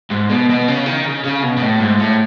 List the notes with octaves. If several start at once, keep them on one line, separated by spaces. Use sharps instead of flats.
G#2
B2
B2
C#3
D#3
C#3
C#3
B2
B2
A2
G#2
A2